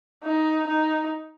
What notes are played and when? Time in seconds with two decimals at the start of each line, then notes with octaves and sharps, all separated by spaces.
0.24 D#4
0.67 D#4